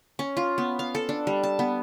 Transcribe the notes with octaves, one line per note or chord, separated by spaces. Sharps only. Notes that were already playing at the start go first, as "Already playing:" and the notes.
C#4
F4
B3
F5
A4
D4
G3
A5
B3